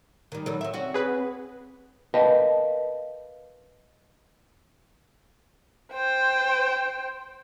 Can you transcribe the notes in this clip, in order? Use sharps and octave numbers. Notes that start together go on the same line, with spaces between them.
D#3 G3
D#3 F#3 G3 A4
F#3 C4 E5
C#4 F#4
C4 G#4 B4
A#4 B4 D#5 F5 G5 A5
C5 G5